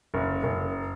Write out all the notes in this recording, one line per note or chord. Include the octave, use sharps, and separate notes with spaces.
F#1
F#1